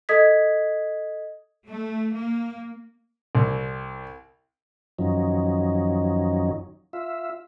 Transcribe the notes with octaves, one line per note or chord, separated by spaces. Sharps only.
A4 D#5 D#6 G#6 B6
A3
A#3
C2
F#2 D#3 F3 F#3 C#4 D#4
F4 E5